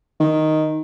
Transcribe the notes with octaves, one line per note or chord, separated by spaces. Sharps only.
D#3